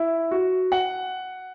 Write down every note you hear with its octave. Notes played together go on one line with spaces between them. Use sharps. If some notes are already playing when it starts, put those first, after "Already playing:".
Already playing: E4
F#4
F#5